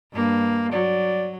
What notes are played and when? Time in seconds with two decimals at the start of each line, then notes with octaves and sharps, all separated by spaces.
0.13 G2 A#3
0.72 F#3 D5